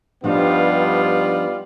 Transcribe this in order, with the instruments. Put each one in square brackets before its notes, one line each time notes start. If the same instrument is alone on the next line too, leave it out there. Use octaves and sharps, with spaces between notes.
[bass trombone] G2 [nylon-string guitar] F3 D4 C5 [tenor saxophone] G3 [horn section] B3 D#4 F4